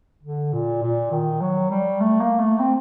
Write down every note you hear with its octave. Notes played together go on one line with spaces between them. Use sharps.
D3
A#2
A#2
D#3
F#3
G3
A3
A#3
A3
C4